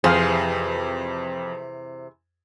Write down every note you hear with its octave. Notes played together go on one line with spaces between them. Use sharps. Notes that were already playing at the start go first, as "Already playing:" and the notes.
F2 C3 E3 G#4 C5 F5